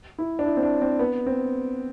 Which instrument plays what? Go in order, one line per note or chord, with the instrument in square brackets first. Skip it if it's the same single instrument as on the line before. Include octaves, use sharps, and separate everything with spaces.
[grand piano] E4
D4
E4
C4
D4
C4
B3
C4